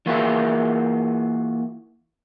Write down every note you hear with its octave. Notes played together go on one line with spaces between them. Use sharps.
E3 A#3 F4 F#4 G#4 E5